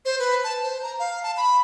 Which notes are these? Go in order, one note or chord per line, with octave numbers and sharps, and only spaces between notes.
C5
B4
A5
C5
A#5
F5
A5
B5